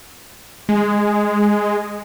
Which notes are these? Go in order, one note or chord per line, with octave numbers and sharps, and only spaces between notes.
G#3